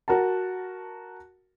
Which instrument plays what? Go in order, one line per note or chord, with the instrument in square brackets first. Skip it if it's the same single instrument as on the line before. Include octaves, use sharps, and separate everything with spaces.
[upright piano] F#4 A#4 F#5 A5